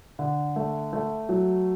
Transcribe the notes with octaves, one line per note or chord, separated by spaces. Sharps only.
D3
A3
A3
F#3